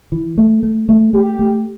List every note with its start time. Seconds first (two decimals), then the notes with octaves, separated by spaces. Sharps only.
0.12 E3
0.38 A3
0.63 A3
0.89 A3
1.13 A3 G4
1.39 A3